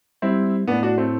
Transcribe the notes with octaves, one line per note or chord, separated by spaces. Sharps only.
G3 C4 E4
A2 B3 D4
D4 F#4
A3 C4